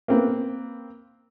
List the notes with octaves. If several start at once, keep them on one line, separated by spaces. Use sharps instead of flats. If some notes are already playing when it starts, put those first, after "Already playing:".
A#3 C4 B4